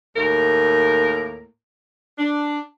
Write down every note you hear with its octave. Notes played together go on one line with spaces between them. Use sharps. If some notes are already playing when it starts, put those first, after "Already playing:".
D#2 A2 A#3 A#4
D4